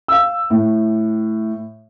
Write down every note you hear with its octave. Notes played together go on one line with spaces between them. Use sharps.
F5 E6
A2